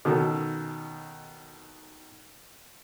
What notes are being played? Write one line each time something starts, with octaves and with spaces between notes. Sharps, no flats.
B2 D#3 C#4 A4